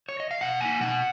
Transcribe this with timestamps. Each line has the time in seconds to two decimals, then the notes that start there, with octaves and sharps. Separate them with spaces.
0.09 C#5
0.20 D#5
0.31 F5
0.41 B2 F#5
0.61 A#3 D#4 G#5
0.81 B2 F#5